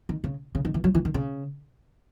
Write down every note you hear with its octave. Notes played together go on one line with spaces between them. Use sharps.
D#3
C#3
C#3
D#3
E3
F#3
E3
D#3
C#3